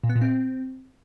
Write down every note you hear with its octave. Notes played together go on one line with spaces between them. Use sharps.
A#2
B3
A#2
C4